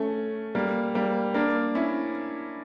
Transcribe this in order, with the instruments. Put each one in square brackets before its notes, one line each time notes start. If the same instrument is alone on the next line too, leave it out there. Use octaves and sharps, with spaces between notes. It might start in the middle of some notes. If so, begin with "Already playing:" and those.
Already playing: [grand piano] A3 C#4
G3 A#3
G3 A#3
A#3 D4
C#4 E4